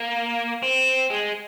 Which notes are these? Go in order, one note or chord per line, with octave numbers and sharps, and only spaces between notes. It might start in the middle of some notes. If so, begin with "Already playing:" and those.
Already playing: A#3
C4
G#3